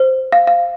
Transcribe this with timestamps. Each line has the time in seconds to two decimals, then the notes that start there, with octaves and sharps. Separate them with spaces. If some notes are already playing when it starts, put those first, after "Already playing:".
Already playing: C5
0.32 F5
0.47 F5